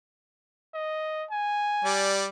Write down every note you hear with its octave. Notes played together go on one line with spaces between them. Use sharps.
D#5
G#5
G3 D5